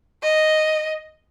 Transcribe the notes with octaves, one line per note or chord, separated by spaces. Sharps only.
D#5